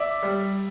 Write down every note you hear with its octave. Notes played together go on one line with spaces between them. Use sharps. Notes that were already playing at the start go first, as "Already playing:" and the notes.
Already playing: D5 E5
G3